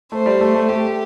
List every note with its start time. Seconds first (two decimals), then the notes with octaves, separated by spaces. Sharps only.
0.12 A3 C5
0.26 G3
0.41 A3
0.55 A3
0.69 A3 G4